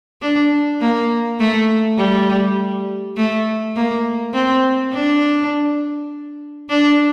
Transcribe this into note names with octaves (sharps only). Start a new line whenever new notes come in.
D4
A#3
A3
G3
A3
A#3
C4
D4
D4